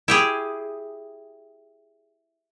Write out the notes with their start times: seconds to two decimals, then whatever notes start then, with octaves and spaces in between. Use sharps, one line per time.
0.08 E4 G4 G#4